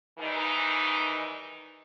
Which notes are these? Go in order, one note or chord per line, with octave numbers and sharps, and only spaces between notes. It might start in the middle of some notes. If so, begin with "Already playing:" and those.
G#2 D#3 E3 G3 D#4